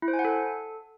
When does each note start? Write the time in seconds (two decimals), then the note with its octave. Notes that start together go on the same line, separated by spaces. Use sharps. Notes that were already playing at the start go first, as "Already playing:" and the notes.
0.02 E4
0.08 C5
0.13 G#5
0.19 F#5
0.25 A4